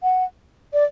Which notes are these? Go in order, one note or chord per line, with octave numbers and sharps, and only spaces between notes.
F#5
D5